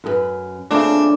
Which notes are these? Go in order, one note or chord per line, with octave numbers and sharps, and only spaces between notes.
F#2 G#4 B4
A#2 C#3 A3 C4 D4